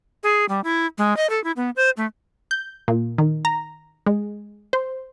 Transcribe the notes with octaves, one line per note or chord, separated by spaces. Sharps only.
G#4
G3
E4
G#3
D#5
A4
E4
B3
C5
A3
G6
A#2
D#3
A#5
G#3
C5